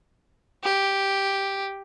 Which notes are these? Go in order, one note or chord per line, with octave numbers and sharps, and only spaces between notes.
G4